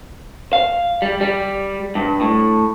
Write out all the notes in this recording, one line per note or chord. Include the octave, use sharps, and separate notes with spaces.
F5
G3
G3
G2
A2